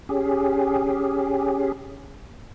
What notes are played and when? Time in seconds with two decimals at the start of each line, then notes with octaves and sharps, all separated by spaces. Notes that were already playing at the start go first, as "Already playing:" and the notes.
0.09 C#4 G4 G#4